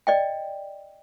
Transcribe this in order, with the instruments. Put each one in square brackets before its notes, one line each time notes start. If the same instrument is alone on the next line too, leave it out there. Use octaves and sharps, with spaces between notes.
[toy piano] D5 D#5 G5